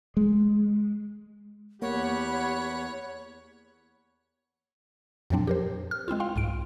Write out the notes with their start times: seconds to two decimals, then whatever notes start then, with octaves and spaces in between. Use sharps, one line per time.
0.17 G#3
1.82 E2 A#3 G4 C#5 F#5 B5
5.30 F2 A#2 F3 F#3 C4 D4
5.47 G4 A#4 C5
5.91 F6
6.08 G#3 C4 E4 F4
6.20 F5 G5 C6
6.36 C2 G#2 D7